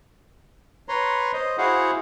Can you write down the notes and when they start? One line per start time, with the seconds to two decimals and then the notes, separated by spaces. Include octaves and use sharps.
0.89 B4 C#5 A#5 C6
1.33 C5 D#5
1.58 E4 F#4 G#4 C5 F5 F#5